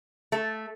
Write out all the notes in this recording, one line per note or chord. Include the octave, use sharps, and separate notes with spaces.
A3